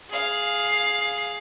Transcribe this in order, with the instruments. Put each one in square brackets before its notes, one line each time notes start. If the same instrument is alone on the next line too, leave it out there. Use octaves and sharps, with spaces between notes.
[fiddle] G#4 F5